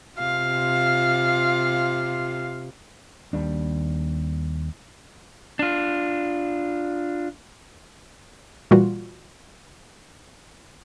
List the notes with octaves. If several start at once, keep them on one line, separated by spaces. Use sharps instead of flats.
C3 F4 F5
D#2 G3 D4
D4 F4
A#2 E3 G3 F4 F#4